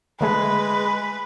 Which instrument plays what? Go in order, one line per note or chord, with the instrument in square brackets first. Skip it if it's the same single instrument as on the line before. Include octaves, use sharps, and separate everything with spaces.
[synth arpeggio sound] D3 A3 G#4 [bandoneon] G#3 [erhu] B4